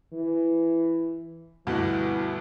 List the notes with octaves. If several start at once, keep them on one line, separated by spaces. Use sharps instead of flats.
E3
D2 G2 B2 E3